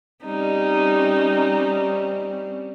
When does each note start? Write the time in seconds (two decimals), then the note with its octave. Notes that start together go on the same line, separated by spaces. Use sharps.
0.24 G3 C4 C#4 D#4